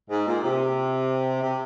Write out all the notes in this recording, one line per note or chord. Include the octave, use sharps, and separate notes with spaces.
G#2
A#2
C3
C3